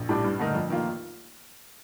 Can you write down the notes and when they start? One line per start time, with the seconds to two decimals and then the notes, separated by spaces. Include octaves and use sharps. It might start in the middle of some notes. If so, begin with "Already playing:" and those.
Already playing: A#1
0.09 A2 G3 D4
0.24 G2
0.39 D3 A3 D#4 A#4
0.55 F2
0.70 D#3 A#3 F4